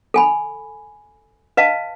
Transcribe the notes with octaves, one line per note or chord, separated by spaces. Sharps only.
A4 G#5 B5
B4 D#5 F5 A5